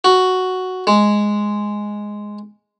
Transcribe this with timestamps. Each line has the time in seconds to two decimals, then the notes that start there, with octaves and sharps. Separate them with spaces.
0.04 F#4
0.87 G#3